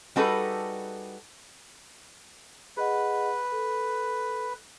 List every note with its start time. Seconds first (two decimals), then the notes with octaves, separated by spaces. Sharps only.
0.16 G3 D#4 F#4 G#4 A4 B4
2.77 G#4 B4 D#5 F#5
3.52 A4